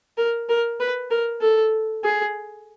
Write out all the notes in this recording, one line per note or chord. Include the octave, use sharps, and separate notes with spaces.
A#4
A#4
B4
A#4
A4
G#4